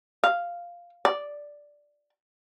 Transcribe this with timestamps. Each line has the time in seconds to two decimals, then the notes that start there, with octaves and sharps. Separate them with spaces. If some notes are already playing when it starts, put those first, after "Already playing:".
0.24 F5
1.05 D5